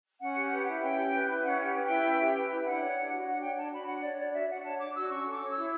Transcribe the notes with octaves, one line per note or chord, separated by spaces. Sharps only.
C#4 F#5
G4
B4
E4
C#4 G5
G4
B4
E4
C#4 F#5
G4
B4
E4 G5
C#4
G4
B4
E4
D4 F#5
C#5
D4
F#4
D4 F#5
C#5 G5
D4 A5
F#4 B5
D4 F#5
C#5 D5
D4 D5
F#4 E5
D4 F#5
C#5 A5
D4 D6
F#4 E6
C#4 C#6
A4
D6
C#5
E6
E4